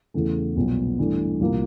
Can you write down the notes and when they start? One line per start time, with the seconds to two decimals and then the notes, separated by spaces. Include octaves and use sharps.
0.14 E2 C#3 E3 A3
0.56 B1 A#2 G3 B3
0.99 G2 E3 A3 D4
1.41 C2 A#2 F3 A#3